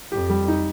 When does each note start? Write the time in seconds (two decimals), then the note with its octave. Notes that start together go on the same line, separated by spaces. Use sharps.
0.12 F2 G4
0.29 G3
0.48 D#4